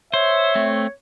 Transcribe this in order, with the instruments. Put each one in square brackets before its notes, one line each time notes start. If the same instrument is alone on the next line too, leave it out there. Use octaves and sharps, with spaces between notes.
[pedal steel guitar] C5 [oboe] C#5 [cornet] E5
[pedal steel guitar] A3 C4